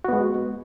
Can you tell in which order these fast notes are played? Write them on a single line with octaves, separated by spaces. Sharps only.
F#4 B3 G#3